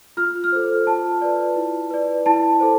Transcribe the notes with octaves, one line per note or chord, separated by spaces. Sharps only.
F4 F6
F6
A4 C5
F4 A5
B4 D5
E4
B4 D5
E4 A5
A4 C5